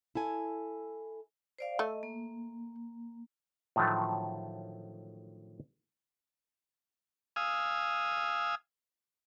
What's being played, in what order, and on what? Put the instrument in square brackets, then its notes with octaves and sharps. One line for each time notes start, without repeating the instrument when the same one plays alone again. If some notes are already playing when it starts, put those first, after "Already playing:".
[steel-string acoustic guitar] E4 A4 G#5
[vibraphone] C5 D5 F5
[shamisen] A3 [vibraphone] D#5
[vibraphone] A#3
[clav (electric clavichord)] A2 D3 D#3 F3 F#3 A3
[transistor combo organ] F5 G#5 D#6 E6